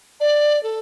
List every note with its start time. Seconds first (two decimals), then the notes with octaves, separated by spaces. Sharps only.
0.20 D5
0.63 A4